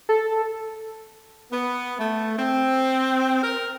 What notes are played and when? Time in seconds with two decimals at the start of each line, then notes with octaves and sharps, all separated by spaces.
0.09 A4
1.51 B3
1.99 A3
2.38 C4
3.41 A#4